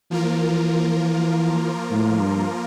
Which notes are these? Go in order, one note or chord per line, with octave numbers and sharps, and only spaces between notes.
E3 F3 A#3 F4 A#4
A2
G2